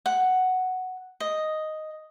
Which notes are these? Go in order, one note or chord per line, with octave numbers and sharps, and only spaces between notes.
F#5
D#5